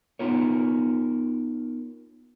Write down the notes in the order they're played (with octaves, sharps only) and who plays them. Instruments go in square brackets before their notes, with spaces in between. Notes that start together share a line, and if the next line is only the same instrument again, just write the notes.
[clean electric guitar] B3 D#4 F4 A#4 C#5